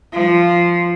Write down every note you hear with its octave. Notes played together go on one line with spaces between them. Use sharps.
F3